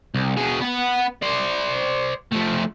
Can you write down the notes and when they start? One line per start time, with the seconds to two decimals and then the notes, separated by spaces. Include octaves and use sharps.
0.14 C2
0.37 B2 G#4
0.61 B3 F#5
1.22 C5 D5
2.32 F3 A3